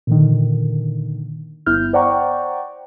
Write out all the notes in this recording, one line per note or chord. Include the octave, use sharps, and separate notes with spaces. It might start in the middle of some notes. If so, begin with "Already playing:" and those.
A#2 D3 D#3
G1 B3 E4 F6 G6
C5 D5 F#5 G5 A#5 C#6